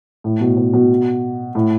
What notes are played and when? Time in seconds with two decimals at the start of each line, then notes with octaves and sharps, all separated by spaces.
0.24 A2
0.41 B2
0.57 B2
0.74 B2
1.55 A2